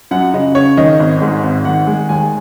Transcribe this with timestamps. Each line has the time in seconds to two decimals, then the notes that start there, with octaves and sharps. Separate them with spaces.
0.11 F#2 F#5
0.34 C#3 D#5
0.55 C#3 C#5
0.77 D#3 D#5
1.00 G#1
1.22 G#2
1.43 G#1
1.65 D#3 F#5
1.87 G#3
2.09 D#2 G#5